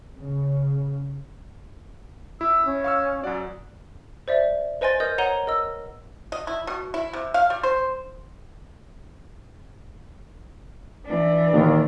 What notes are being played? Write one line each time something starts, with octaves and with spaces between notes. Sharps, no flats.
C#3
E4 E6
C#4
F5 C#6 E6
F#2 F#4 D5
C5 D5 E5
B4 C5 D#5 G#5 C6 A6
A#4 D#5 D#6 G6
C#5 F#5 A#5 D#7 G7
A#4 D#5 E6
D#5
E4
B2
E4
C3
F5
G3
C5
E3 D4
D#2 A#2 D#3